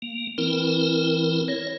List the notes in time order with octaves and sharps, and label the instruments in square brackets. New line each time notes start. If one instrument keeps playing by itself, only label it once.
[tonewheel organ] A#3
[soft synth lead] E3 [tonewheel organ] C4 E4 A#4
[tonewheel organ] C#5 [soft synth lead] A#6